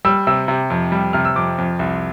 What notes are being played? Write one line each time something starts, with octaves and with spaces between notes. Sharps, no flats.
G3 E6
C3 E6
C3
F2
G3
C3 F6
E6
F2 D6
F2
C2